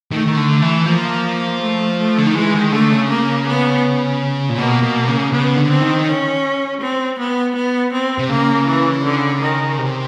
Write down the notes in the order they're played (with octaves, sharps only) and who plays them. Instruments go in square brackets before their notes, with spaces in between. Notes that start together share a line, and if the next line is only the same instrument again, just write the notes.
[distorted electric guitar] D#3 [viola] A3
[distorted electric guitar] D#3
D3
E3
[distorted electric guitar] F3 [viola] A#3
[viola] A3
A3
[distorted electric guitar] D3
D#3
[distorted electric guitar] E3 [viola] G#3
[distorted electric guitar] D#3
[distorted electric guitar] D3 [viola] A3
[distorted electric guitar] C#3
[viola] A#3
B3
[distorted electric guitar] A#2
[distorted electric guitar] B2 [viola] A#3
[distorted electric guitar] B2
C#3
[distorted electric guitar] C#3 [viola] B3
[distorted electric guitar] D3
[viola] C4
[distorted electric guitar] D#3
[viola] C#4
C4
B3
B3
C4
[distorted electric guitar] C3
[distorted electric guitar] C#3 [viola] A#3
[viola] E3
D3
D#3
[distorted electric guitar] C3